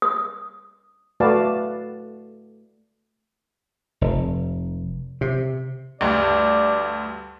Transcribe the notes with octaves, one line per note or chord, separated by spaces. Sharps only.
D#6
A3 F#4 B4 D5 F5 A5
F1
C3
D2 G2 D5